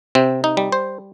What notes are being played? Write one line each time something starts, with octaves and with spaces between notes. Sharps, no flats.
C3 C4
D#4
G3
C5